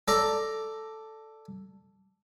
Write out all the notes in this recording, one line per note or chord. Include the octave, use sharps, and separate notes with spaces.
A4 D5 A#5